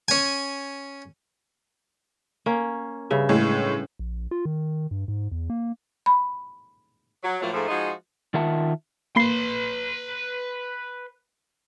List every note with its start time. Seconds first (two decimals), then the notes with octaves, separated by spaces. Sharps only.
0.08 C#4 G#5
2.46 A#3 C#4
3.10 G2 C#3 E5
3.29 A2 G#3
3.99 A#1
4.31 F4
4.45 D#3
4.91 G2
5.08 G#2
5.31 E2
5.50 A#3
6.06 B5
7.23 F#3
7.42 A2 F3 F#3 A3 A#3 F4
7.54 G#2 F3 A3
7.69 F3 G#3 D#4 F4 F#4 G#4
8.34 D#3 F4 A#4 E5 F#5 A5
9.16 A#3 B4 B5 C6 C7